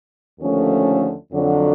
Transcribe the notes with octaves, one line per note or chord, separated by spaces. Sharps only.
D#2 D3 F3 A3 C#4
F2 D3 F#3